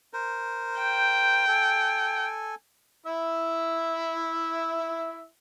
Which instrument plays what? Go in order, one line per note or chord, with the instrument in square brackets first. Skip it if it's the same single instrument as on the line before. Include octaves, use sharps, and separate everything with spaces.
[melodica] A#4 C5
[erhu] G5
[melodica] A4 G#5
[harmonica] E4 E5